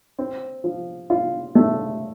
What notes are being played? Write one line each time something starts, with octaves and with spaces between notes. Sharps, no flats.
C4
F3
F4
A3